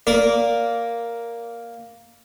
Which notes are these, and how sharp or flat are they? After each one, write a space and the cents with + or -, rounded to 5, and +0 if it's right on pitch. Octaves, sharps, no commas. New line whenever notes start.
A#3 +0 A#4 +0 D5 -20